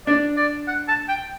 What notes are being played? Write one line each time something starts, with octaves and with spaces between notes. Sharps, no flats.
D4 D5
D5
F#5
A5
G5